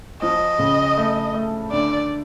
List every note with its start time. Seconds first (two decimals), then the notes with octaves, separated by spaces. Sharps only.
0.22 F3 D#5
0.59 C#3
0.97 A3
1.34 A3
1.72 D3 D5